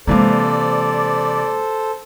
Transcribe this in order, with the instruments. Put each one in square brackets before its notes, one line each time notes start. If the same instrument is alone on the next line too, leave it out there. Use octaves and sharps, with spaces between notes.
[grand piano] C3 E3 F5 [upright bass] G#3 A#3 [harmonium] A4 C5 [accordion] D5